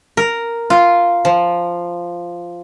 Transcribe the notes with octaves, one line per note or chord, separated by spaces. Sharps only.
A#4
F4
F3